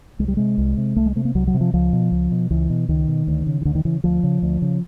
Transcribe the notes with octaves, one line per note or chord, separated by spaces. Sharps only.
C2 G#3
G3
C3 G#3
C2
C3
C2 A3
G#3
C3 A3
A#3
C2 F#3
F#3
C3
F3
C#2 F3
B2
C#2
B2
C#2 E3
B2
C#2 D#3
B2
D2
C#3
D#3
D2 D3
D#3
C#3 E3
D2 F3
C#3
D2
C#3